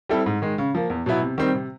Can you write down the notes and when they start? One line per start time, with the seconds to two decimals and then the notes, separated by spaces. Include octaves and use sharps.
0.09 G3 C4 E4 A4
0.26 G#2
0.42 D#3 G#3
0.58 C#3
0.75 F3 A#3
0.90 E2
1.06 B2 F#3 B3 E4
1.22 C3
1.38 D#3 G3 C4
1.54 C3